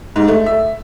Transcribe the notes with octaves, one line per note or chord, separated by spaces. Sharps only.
G#2
A3
E5